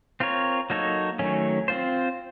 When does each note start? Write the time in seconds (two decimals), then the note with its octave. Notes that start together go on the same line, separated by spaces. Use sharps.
0.20 C4 F4 A#4 C#5
0.70 F#3 A#3 D#4 A4 C#5
1.19 D#3 F#3 A3 C#4
1.68 C4 F4 C5